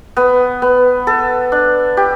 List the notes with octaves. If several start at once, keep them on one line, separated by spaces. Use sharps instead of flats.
B3
B3
A4
D4
G4